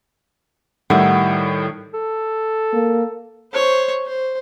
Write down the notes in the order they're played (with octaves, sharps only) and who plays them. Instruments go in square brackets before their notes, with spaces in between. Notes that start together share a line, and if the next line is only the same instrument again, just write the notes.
[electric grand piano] A2 D#3 G3 [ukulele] E4 F#5
[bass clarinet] A4
[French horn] A#3
[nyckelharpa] C5 C#5
C5